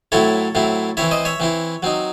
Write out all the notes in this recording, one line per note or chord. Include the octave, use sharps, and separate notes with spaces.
A2 F#3 C4 E4 A4 C#5
A2 F#3 C4 E4
E3 C4 E4 C#5 E5
C5 D#5
C#5 E5
E3 C4 E4
F#3 C4 D#4